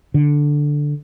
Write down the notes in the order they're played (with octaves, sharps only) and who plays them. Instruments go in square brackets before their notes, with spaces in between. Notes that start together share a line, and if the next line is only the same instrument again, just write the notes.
[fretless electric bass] D3